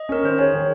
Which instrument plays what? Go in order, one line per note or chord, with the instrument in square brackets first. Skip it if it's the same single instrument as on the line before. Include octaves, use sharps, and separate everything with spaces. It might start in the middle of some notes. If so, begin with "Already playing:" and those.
Already playing: [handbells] D#5
[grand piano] C#4 [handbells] A#4
[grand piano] D#3 [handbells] C5
[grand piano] G#4 [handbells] C#5
[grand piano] D#3